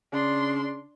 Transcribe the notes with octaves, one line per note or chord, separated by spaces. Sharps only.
C#3 D4 C6